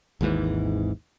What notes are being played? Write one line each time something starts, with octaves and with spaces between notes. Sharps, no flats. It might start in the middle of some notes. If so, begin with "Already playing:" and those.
G#1 D#2 G#2 E3